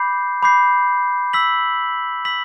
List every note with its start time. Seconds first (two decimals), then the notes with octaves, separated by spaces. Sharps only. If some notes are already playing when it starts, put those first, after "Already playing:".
Already playing: B5 D6 G6 C7
0.43 B5 D6 G6 C7
1.33 E6 B6 F#7
2.25 E6 B6 F#7